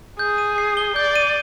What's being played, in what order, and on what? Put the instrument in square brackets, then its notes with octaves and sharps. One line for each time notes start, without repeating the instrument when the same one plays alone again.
[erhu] G#4 [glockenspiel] G6
[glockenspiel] D#7
C7
G7
[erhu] D5 [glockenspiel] G6
[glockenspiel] D#7